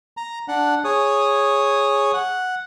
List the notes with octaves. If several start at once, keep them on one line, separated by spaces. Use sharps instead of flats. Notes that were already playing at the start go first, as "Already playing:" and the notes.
A#5
D4 F#5
G#4 C#5 D#6
F#5